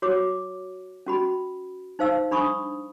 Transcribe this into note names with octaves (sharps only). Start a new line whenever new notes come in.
F#4 C#5 D6
C#4 F#4 B5
D#4 C5 F5 E6
D4 B5 C#6 D#6